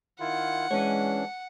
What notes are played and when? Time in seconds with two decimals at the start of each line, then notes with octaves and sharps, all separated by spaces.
0.20 D#3 E4 F4 F#5
0.71 E3 G#3 C#4 D4 C#5